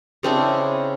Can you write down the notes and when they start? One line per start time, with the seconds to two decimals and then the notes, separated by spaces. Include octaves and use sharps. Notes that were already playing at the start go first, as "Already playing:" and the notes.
0.23 C#3 C4 D4 E4